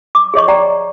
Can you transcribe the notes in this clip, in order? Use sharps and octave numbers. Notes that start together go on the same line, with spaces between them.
D6
G#4 C#5 D#5 C#6
D5 G5 A#5